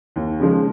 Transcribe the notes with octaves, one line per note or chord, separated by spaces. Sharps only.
D#2
C#3 F3 G#3